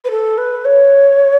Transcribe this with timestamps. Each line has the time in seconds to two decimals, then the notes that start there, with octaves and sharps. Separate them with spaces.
0.04 B4
0.10 A4
0.37 B4
0.65 C#5